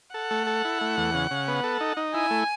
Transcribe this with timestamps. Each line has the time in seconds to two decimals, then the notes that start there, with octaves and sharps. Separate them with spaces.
0.14 A4 F#5
0.31 A3
0.47 A4
0.65 E4
0.81 A3
0.97 E2
1.14 C#3
1.31 C#3
1.48 B3
1.64 A4
1.81 D#4
1.97 D#4
2.14 E4 G#5
2.30 A3